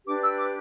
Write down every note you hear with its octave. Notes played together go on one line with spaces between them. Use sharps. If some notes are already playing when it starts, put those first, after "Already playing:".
D4 G4 B4 D6
E6
D6